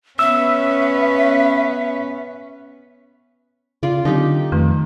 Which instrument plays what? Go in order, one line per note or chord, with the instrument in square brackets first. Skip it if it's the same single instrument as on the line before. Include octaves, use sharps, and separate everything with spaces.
[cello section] B3 C#4 B4 [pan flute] E5 [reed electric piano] E6
[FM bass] C#3 [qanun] F4 D5
[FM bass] D3 [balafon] F#3 C4 [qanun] D#4 G4
[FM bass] F2 [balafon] D#3 A3